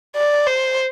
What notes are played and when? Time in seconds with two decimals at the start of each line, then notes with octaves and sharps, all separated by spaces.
0.16 D5
0.47 C5